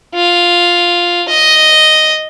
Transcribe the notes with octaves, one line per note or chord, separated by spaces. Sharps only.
F4
D#5